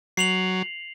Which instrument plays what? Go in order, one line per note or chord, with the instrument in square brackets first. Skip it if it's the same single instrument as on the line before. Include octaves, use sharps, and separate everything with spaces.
[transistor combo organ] F#3 [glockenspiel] C7 F7 F#7